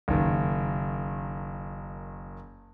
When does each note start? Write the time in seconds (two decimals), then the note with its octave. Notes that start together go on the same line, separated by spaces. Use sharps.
0.08 F#1 D#3